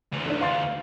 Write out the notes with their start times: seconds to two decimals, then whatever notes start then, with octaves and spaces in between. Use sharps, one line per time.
0.13 D2 E3
0.26 D3 D4
0.41 F5 C6 A6